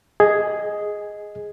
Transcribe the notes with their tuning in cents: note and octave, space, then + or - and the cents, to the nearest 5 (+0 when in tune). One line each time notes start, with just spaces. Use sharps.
G#4 +0 D#5 +0